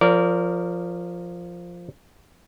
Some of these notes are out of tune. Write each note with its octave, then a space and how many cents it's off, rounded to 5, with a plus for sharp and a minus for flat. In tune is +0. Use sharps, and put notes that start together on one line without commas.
F3 +0 A#4 -15 D5 -30